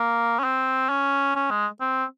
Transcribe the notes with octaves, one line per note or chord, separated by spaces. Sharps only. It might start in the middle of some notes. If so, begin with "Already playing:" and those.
Already playing: A#3
C#4
C4
C#4
C#4
G#3
C4